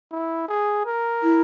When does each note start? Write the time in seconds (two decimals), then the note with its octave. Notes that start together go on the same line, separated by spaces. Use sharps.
0.11 E4
0.48 G#4
0.86 A#4
1.23 E4